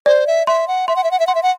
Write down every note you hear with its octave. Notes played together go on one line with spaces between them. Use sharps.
C5 D5
E5
E5 C6
F#5
E5 C6
F#5
E5
F#5
E5
F#5 C6
E5
F#5